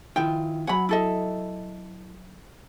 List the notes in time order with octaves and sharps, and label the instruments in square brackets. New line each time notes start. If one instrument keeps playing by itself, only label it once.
[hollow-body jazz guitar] D#3 E4 F4 [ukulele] G5
[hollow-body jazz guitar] F#3 G#5 [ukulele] F#5 B5
[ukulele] E4 A4 D#5